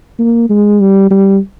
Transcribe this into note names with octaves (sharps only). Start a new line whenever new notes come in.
A#3
G#3
G3
G3